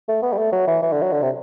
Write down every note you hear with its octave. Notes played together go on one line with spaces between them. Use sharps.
A3
B3
G3
A3
F#3
E3
E3
D3
F#3
D3
C3